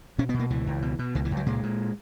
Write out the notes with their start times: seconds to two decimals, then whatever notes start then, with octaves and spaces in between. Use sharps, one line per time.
0.18 B2 C#4
0.29 B3
0.34 B2
0.39 A#3
0.50 C#2 E3
0.67 C#2
0.82 B2
0.99 B2
1.15 C#2 D#3
1.25 E3
1.31 C#2
1.37 F#3
1.46 A#2 G#3
1.63 A#2